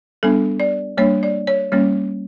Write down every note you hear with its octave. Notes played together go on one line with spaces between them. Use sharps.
G3 B3 D4 A4
D5
G3 A#3 D4 C#5
D5
C#5
G3 A#3 C#4 C#5